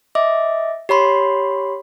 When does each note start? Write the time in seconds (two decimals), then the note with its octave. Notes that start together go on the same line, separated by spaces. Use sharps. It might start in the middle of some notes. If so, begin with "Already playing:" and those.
0.15 D#5 E5 D6
0.89 G4 C#5 B5 C6